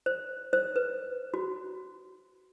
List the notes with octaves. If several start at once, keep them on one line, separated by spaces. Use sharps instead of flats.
C5
C5
B4
F#4